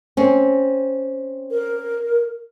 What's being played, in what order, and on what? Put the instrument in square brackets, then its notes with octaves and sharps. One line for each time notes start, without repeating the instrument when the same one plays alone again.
[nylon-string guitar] C4 C#4
[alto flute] A#4